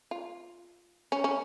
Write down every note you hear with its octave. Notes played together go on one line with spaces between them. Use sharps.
F4
C#4
C#4